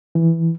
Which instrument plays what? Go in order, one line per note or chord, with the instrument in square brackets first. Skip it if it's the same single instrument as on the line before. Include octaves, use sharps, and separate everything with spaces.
[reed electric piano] E3